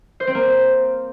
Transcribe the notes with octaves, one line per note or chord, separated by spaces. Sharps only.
C5
C4
A#3